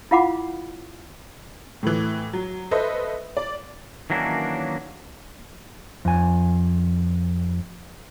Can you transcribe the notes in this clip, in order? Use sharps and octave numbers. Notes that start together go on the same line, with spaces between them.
E4 F4 F5 F#5 B5 D6
A2 E3
F#3
A4 B4 C5 D#5 E5
D5
D#3 E3 F#3 A#3 C#4 D4
F2 G#5